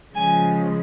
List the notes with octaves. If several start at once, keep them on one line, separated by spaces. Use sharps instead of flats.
C#3 F3 G#3 G#5